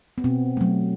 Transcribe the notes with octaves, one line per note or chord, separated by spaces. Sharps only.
B3
B2 C4
F#3 A3